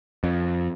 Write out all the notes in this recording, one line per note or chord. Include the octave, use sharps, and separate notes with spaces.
F2